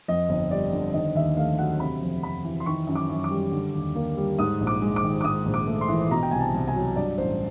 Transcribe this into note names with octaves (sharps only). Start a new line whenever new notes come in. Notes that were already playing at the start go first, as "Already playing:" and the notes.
F2 D#5
G1
G3 D5
D3
D#3 D#5
D#2 E5
A3 F5
F#3 F#5
C3 B5
F2
F2 B5
E3
C6
D#3 C#6
F#2
D6
F#2
D6
G3
D3
D#2
A#3
G3
G#2 D#6
A#1
D6
G#3
D6
D#3
D6
G#2 D#6
A#1
D6
A3
C6
E3
B2 A#5
G5
C2 G#5
A5
C2
G#5
F#3
G2 D5
A1 C5